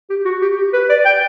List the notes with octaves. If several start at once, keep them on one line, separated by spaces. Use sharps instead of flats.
G4
F#4
G4
G4
B4
D5
G5